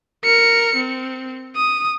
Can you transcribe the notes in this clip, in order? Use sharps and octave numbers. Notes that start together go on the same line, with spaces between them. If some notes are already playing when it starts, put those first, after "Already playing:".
A#4 C#7
C4
D#6